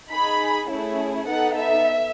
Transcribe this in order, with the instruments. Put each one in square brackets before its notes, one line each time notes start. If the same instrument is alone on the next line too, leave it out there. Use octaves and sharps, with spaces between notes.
[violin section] D#4 G#4 B5
A3 C#4 E4 G#4
B3 D#4 A4 F#5
E5